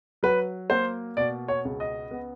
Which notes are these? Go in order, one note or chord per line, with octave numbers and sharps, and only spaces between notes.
F#3 B4
A#3 C5
B2 D5
C#5
C#2
D#5
B3